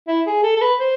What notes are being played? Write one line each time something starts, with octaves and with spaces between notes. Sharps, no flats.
E4
G#4
A4
A4
B4
C5